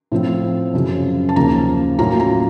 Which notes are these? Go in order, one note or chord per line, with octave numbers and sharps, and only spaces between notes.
A2 F3 C4
F#2 C#3 F3
A5
D#2 C#3 F3 A#3 A#5
A2 F#3 A#3 C#4 F4 A#5
A#5